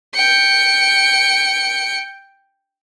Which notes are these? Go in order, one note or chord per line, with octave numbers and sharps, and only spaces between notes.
G5 C#7